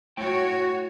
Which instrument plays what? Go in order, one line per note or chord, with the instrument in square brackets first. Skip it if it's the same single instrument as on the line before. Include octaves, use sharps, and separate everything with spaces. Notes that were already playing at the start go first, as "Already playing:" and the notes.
[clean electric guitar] A3 E4 G5 [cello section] F#4 C#5